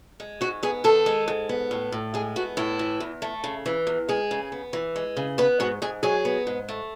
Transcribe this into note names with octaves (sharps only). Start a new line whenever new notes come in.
G#3
G#2 F#4
B3 G#4
D#3 A4
G#3
G#2
B3
A2
A2
G#3 G#4
B3 F#4
A2 E4
E3
E2
A3
C#3
E3
E2
G#3 G#4
C#3
B3
E3
G#3
C#3
B3 B4
G#2 F#4
G#2 G#4
F#3 G#4
B3
G#2
A3